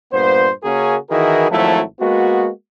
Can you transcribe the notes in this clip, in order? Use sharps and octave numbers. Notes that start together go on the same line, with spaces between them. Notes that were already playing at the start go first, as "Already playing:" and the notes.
G2 A#2 B3 C5
C#3 A#3 C#4 F#4 G#4 A#4
D#3 E3 E4 F#4 G#4 A#4
G#1 F3 F#3 A3 E4 A4
G#3 A#3 B3 F#4